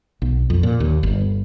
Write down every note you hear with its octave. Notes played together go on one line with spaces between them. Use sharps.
B1
F2
A#2
D#2
G1